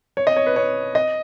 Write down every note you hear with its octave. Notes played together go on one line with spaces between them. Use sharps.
C#5
D#5
C#5
B4
C#5
D#5